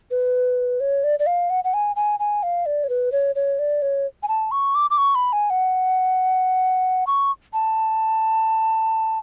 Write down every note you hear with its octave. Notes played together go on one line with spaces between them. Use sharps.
B4
C#5
D5
D5
F5
F#5
F#5
G#5
G#5
G#5
F5
D5
C#5
B4
C#5
C#5
D5
C#5
G#5
A5
C#6
D6
D6
C#6
B5
G#5
F#5
C#6
A5